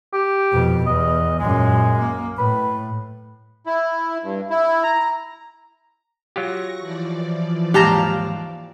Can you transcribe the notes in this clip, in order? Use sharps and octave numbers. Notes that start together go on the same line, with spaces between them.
G4
F2 B2
E2 D#5
F#2 A#2 G#3
A#3
A2 B4
E4
G2
E4
A#5
F#3 F4 G4 C#6 A#6
E3 F3 D5
D#2 G#2 G4 F5 A5 A#5